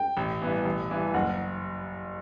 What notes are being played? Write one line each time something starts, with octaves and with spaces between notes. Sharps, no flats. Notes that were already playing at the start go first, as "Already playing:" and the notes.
Already playing: G5
A1
G2 E3 B3
A1
G2 E3
F#1 F#5